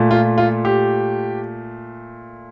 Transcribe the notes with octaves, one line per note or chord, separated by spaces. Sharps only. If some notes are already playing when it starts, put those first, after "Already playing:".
Already playing: A#2 A3
F4
F4
G4